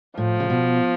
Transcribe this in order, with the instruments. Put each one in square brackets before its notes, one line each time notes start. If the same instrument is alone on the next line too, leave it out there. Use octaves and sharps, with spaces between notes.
[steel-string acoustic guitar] A2 [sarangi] F3
[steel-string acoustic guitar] C#3
B2